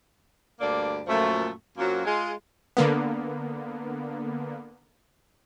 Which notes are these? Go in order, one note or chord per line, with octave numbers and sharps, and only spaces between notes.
D2 G2 A#3 D4 D5
F#2 A#2 F3 A3
F#2 F#3 A#3 C4 F4 F#4
G#3 F4
D3 A#3 B3